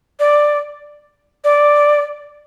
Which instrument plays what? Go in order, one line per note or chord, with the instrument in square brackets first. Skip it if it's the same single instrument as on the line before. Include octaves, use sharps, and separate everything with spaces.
[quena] D5
D5